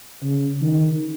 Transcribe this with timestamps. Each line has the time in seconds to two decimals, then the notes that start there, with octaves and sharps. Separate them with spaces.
0.23 C#3
0.62 D#3